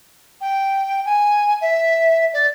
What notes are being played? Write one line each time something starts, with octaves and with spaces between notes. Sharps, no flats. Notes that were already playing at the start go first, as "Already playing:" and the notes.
G5
G#5
E5
D5